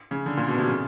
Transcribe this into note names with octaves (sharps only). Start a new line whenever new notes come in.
C#3
D3
A#2
B2
C3
C#3